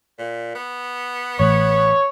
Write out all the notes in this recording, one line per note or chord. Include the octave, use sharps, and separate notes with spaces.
A#2
B3
A1 C#5